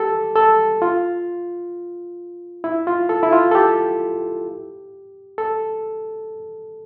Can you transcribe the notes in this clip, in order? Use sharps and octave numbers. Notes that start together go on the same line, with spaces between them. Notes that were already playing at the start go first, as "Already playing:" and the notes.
Already playing: G4 A4
A4
F4
E4
F4
A4
E4
F4
A4
G4
A4